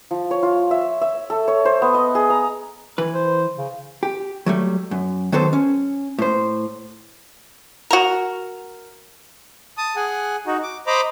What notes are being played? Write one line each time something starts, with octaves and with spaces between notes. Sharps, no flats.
F3
C#5
F4
E5
E5
A4
C#5
C5
B3
D#5
G#4
A#5
E3 B4
C5
C#3
G4
F#3 G3 A3
F#2
D#3 F#3 B3 A4 C5
C#4
A2 C5
F#4 A#4
A5 D#6
G#4 F#5 G#5
D#4 F#4
D6
C5 D#5 A#5 B5 D6